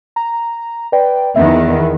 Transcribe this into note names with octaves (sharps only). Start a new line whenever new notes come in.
A#5
B4 D5 G5
E2 D#3 B3 E5